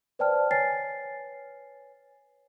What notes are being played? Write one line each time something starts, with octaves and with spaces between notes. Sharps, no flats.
B4 C5 D5 G5 A5 F6
B4 C#5 G#5 A6 C7